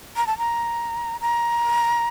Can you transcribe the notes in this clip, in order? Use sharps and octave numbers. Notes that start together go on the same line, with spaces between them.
A#5
A5
A#5
A#5